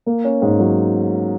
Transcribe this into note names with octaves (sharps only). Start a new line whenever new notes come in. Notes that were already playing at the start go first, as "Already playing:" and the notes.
A#3
C#4
G#2
F#3